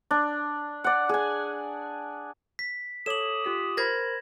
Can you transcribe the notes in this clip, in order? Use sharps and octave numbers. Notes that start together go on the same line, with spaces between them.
D4
D5 F#5
G#4 G#5
B6
A4 C#5 D6 D#6 E7 F#7
F4 G4 B6
A#4 C5 B5 G#6 A#6